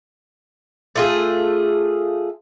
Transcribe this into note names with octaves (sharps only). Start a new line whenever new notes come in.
A3 F4 G#4